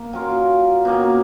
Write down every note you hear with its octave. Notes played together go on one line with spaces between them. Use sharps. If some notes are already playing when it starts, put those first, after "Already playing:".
Already playing: A#3
F#3 C#4 F4 A#4
B2 A#3 C#4